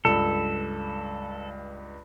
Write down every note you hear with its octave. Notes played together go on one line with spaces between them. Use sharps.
C#2 G2 A4 B5